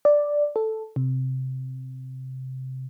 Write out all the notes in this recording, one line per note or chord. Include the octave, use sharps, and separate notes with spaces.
D5
A4
C3